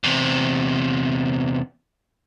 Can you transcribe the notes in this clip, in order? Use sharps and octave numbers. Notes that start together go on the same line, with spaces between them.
E2 C3